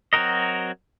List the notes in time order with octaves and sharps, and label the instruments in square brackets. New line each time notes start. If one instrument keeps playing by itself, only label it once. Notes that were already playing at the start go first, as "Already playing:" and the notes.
[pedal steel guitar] F#3 C4 F#4 A#4 D#5